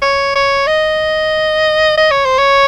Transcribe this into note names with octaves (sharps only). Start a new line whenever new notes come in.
C#5
C#5
D#5
D#5
C#5
C5
C#5